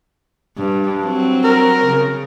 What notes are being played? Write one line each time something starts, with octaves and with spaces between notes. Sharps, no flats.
G2
F#3 C4
A#4
C#3